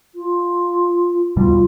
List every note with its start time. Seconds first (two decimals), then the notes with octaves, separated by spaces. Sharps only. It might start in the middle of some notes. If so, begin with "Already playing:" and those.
0.15 F4
1.36 D#2 B2 G3 F4